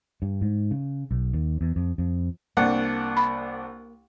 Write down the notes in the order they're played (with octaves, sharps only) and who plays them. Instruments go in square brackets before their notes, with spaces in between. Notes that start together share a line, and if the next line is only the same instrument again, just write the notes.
[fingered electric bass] G2
G#2
C#3
B1
D#2
E2
F2
F2
[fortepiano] C2 D4 F#5 [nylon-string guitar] A#3
[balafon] B5